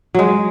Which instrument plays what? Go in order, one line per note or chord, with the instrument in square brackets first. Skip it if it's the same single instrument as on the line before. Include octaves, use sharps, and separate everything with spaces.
[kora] F#3 G#3